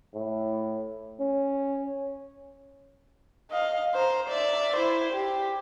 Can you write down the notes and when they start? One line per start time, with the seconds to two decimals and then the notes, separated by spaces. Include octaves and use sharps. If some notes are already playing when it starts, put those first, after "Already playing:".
0.15 A2
1.20 C#4
3.51 D#5 F5
3.94 C5 A#5
4.28 D5 E5
4.76 E4 C5
5.13 G4